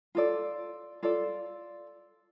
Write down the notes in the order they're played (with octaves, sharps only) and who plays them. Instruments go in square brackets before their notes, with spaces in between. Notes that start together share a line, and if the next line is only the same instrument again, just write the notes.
[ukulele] F4 A4 D5
F4 A4 D5